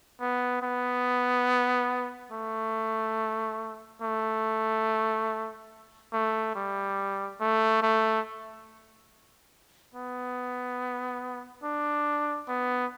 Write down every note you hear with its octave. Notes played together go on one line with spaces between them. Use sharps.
B3
B3
A3
A3
A3
G3
A3
A3
B3
D4
B3